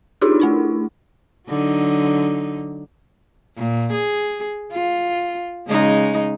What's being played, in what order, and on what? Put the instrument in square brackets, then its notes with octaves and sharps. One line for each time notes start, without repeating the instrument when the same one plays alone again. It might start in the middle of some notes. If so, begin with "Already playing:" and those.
[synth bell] D4 D#4 F4 G4 G#4
A3 D4 E4
[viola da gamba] D3 F#3 D#4
A#2
G#4
F4
C#3 G#3 D#4